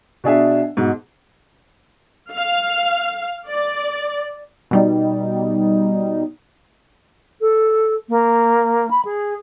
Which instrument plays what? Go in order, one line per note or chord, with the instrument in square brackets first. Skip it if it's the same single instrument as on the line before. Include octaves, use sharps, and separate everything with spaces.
[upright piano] B2 D4 G#4 E5
G#2 B2
[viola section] F5
D5
[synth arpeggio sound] B2 G3 D#4
[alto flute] A4
A#3
B5
G#4